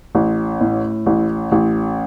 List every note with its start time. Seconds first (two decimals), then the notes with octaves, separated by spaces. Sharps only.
0.15 A1
0.61 A2
1.06 A1
1.52 A1